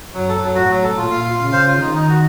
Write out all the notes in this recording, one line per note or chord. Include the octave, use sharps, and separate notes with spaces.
F#2 F#3
A4
F#3
A2 F#4
F#3
A4
A#2 F4
F5
F4
C#3 F5
C5
F4
D#3 D#4
D#4
F#4